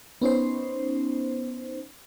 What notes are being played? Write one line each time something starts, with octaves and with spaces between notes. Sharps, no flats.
B3 C#4 D#4 C5